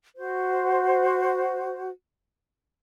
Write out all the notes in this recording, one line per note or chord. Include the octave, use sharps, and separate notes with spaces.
F#4 C5